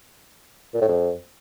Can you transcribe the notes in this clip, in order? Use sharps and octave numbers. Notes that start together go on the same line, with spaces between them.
A#2
A2
F2